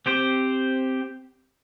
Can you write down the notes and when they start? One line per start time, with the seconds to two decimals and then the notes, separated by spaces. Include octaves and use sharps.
0.06 C4 G4 C5